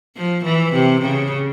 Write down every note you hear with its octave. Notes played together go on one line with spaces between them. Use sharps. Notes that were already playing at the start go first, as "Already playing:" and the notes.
F3
E3
C3
C#3